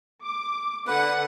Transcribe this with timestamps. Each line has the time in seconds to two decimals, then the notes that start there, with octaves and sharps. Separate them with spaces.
0.23 D6
0.87 D3 B4 F#5